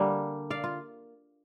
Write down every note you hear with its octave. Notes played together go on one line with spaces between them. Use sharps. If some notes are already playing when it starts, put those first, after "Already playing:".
Already playing: D3 G3 A#3
D5 F5
F4